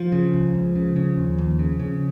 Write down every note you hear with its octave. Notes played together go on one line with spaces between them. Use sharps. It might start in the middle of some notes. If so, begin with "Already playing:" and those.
Already playing: F3
C#3
C#2
C#2
C#3
C#3
D#2
D#2
C#3
C#3